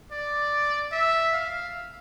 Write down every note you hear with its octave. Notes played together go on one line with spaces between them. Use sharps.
D5
E5
F5